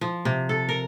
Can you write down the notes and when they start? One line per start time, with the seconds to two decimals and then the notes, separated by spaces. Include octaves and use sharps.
0.01 F3
0.25 C3
0.49 A4
0.69 A#4